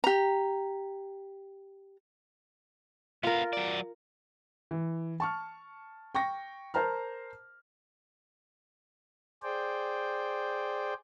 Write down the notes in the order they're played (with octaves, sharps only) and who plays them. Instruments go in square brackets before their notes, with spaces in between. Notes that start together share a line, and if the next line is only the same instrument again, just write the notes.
[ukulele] G4 A#5
[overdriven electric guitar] B3 F5 [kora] F4 A#4
[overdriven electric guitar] F#3 D5
[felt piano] E3
A5 C#6 F6
G5 C#6 A#6
A#4 C5 A5 A#5 F6
[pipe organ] G#4 C5 D5 G5